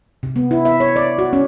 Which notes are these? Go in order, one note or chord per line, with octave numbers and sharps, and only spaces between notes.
C3
B3
E4
E5
C#5
D5
F#4
C#4